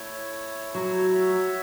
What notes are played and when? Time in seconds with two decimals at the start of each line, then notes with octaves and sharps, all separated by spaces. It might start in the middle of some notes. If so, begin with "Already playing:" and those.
Already playing: A3 E4 C#5
0.75 F#3
1.14 F#4 C#5 E5